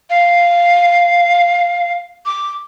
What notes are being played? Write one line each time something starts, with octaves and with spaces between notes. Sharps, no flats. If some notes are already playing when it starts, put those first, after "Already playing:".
F5
D6